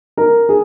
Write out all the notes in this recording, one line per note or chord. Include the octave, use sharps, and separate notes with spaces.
A#4
G#4